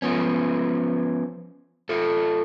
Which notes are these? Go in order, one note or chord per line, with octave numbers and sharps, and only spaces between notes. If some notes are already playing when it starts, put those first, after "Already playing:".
F3 B3 C#4
A3 F4 A4